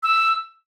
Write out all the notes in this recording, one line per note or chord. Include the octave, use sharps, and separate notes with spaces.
E6